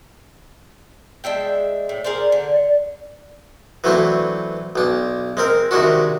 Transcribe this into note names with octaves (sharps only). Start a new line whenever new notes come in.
G#3 D4 E5 G5
A2
G#4 A#4 C5 D5
D3
E3 F#3 A3 C4 D4
B1 D4
G#3 C4 A#4
C3 D#3 G#3 D4 F#4